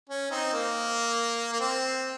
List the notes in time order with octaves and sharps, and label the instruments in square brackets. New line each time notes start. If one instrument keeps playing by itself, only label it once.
[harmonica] C#4
C4 D#4
A#3
A#3
C4